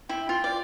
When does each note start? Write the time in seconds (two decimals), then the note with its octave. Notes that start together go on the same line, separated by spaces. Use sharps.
0.09 E4 G5
0.29 F4
0.44 D5